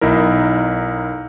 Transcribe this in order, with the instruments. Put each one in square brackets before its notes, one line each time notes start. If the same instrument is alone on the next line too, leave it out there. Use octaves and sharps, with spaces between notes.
[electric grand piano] B1 D#4 E4 A#4